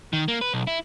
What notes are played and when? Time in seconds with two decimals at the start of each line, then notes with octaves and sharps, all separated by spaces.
0.13 D#3
0.28 A#3
0.41 B4
0.54 B1
0.67 E4